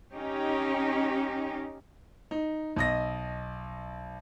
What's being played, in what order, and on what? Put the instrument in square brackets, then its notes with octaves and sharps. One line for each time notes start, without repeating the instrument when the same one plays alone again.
[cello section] C#4 D#4 G4
[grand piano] D#4
B1 D#5 A#6